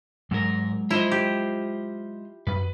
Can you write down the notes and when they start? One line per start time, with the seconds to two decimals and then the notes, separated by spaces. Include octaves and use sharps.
0.31 G#2 F#3 G#3 A#4
0.91 E4 F4 C5 D#5
1.11 G4
2.47 F#2 B4